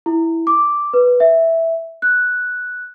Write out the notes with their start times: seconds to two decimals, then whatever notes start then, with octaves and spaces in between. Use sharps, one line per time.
0.06 E4
0.47 D6
0.93 B4
1.20 E5
2.02 F#6